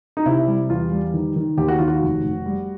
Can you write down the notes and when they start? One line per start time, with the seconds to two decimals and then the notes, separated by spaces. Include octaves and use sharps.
0.17 D#4
0.26 C3 E4
0.47 G3
0.70 E2 F4
0.92 G3
1.14 D#3
1.36 D#3
1.57 D#2 G4
1.68 F#4
1.79 D#3 F4
1.88 F#4
2.02 F1
2.23 F1
2.46 G3